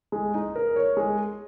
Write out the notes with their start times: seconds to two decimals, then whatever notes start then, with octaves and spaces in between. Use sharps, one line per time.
0.12 G#3
0.34 D#4
0.56 A#4
0.76 C#5
0.97 G#3